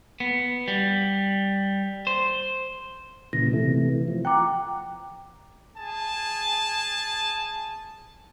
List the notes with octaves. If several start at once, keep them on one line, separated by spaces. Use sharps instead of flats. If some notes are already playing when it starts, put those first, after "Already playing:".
B3
G3
C5
A#2 C#3 E3 A#6
C3 E3 A3
F3
F#5 G5 A#5 D6
G#4 G#5 A5